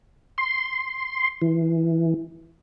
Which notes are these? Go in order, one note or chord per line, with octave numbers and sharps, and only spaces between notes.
C6
E3